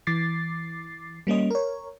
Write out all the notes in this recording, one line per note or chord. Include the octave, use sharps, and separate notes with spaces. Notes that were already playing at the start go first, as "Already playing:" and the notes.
E3 D6 A6 C7
G3 A#3 C#4 D#5
A#4 C#5